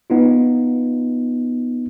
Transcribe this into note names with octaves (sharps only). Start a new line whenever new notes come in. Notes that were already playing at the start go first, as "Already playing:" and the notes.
B3 D#4 F4